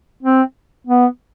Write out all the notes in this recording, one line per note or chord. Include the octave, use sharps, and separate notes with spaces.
C4
B3